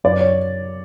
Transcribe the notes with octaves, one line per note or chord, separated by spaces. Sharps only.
F#2 D5
C#5